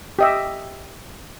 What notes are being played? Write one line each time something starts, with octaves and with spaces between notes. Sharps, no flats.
G4 D#5 E5